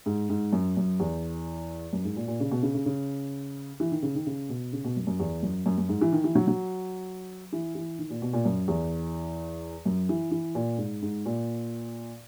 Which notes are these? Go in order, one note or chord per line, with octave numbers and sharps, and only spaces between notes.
G#2
G#2
F#2
F#2
E2
F#2
G#2
A#2
A#2
C#3
B2
C#3
C#3
C#3
E3
D#3
C#3
D#3
C#3
B2
C#3
B2
F#2
F#2
E2
F#2
F#2
F#2
G#2
E3
D#3
E3
F#3
F#3
E3
E3
D#3
A#2
B2
A#2
F#2
E2
F#2
E3
E3
A#2
G#2
G#2
A#2